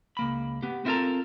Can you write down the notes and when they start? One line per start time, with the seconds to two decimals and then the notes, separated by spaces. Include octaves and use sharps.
0.17 C#2 A#3 B5
0.62 B3 G4
0.85 C4 E4 F4 A4 A#4 A#5